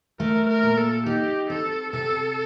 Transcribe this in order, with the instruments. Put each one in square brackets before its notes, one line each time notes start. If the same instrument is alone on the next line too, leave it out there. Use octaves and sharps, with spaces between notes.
[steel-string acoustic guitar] A3 [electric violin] A#4
[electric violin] A#4
[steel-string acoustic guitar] A#2
[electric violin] A4
[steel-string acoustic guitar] D#4 [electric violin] G4
[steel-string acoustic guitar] C4 [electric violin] A4
[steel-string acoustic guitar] C3 [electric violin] A4